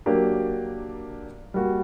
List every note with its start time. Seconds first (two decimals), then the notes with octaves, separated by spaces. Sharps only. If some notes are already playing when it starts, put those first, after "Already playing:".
0.06 F#3 A#3 D4 G4
1.54 G3 A#3 F#4